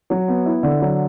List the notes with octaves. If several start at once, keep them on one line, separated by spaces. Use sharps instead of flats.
F#3
B3
E4
D3
F#3